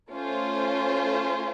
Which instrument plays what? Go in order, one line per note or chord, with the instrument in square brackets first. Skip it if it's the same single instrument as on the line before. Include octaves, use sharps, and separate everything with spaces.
[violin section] A3 C#4 F4 C5